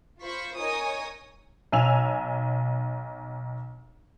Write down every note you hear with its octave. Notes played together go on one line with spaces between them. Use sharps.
F4 C5 B5 C#6
D#4 A#4 C#5 D#5 G#5 D#6
B1 G#5 E6 F7